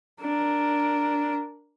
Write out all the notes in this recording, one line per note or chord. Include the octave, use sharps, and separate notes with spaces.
D4 A#4